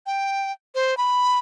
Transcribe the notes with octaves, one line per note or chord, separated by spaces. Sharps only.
G5
C5
B5